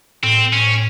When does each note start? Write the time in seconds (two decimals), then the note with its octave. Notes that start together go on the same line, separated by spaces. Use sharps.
0.23 A2 C4
0.53 C#4